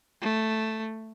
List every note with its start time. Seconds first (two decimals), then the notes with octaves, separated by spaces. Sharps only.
0.22 A3